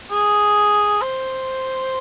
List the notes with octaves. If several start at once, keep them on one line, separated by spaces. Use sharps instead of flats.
G#4
C5